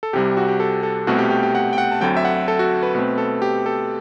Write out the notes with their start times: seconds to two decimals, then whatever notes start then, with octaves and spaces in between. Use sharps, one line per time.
0.03 A4
0.13 C2 C3 G3 G4
0.25 G4
0.37 F#4
0.48 G4
0.60 A4
0.83 A4
1.07 C2 B2 A3 C4 F#4
1.18 G4
1.30 G4
1.43 G4
1.55 F#5
1.73 G5
1.78 F#5
1.92 A5
2.01 D2 D3 F#3 C4 G5
2.17 E5
2.25 F#5
2.48 A4
2.59 F#4
2.83 B4
2.95 B2 A3 C4 B4
3.18 A4
3.42 G4
3.66 A4